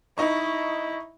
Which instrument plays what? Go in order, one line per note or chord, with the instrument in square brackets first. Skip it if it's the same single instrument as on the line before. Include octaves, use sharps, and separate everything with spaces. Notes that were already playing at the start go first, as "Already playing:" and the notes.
[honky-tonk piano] D#4 D#5 C#6 [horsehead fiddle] E4